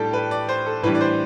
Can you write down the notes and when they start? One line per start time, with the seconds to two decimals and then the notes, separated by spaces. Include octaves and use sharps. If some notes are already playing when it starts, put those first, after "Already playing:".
Already playing: A2 G3 D4 A4 G5 A5
0.13 B4
0.31 D5
0.49 C5
0.66 A4
0.83 A2 E3 G3 D4 B4
0.95 D5
1.01 C5